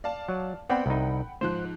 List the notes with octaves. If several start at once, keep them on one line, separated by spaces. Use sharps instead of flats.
D5 F5 A5
F#3
B3 C4 D5 F#5 G5 B5
C2 D#4
G#2 F3 C5 F#6